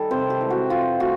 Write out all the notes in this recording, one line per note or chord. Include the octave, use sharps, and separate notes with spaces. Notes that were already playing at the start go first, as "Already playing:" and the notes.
Already playing: D#3 G3 A4
C3 C5
G4
E3 G#3
F#4
E3 F4
A3 F#4